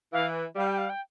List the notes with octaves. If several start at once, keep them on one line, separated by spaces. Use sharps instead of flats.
E3 F5
G3 F5
G5
F5
G5